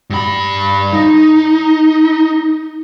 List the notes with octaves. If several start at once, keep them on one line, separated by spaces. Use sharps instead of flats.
G2 B5
D#4